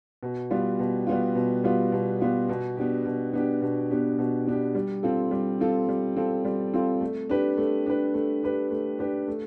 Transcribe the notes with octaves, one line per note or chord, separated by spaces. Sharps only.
B2
G3 B3 F4
B2
G3 B3 F4
B2
G3 B3 F4
B2
G3 B3 F4
B2
B3 D4 G4
B2
B3 D4 G4
B2
B3 D4 G4
B2
B3 D4 G4
G3
C4 F4 A4
G3
C4 F4 A4
G3
C4 F4 A4
G3
C4 F4 A4
A3
D4 G4 B4
A3
D4 G4 B4
A3
D4 G4 B4
A3
D4 G4 B4
A3